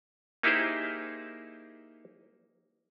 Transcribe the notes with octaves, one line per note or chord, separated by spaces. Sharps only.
A#3 D#4 E4 G4 G#4 C5